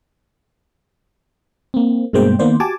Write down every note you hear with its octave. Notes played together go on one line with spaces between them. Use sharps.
A#3 C4
G2 B2 G#3 A#3 C5 G5
D#3 A#3 B3 C5 D5
F#4 G4 G#5 A5 D6